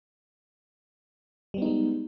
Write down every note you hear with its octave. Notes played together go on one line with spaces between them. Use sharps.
G3 G#3 B3 D#4